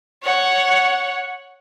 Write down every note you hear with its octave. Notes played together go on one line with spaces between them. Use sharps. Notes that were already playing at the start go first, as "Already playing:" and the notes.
C#5 F#5